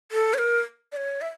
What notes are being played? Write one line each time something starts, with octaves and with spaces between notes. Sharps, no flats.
A4
C#5
A#4
D5
C#5
E5